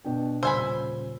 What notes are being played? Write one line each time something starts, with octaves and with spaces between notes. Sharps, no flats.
B2 D4 G5
D#1 C#3 C5 G#5 B5 E6